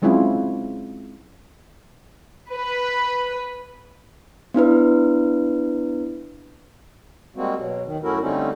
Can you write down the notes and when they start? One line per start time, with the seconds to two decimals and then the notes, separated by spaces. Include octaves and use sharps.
0.02 F#3 G#3 C4 C#4 E4 F4
2.52 B4
4.54 B3 D4 E4 B4
7.36 G3 G#3 A#3 C4 F#4
7.59 B2 F#3
7.85 D#2 D#3
8.03 F#2 A3 C#4 E4 F#4 A#4
8.21 D3 G3 A3 C4 C#4 D#4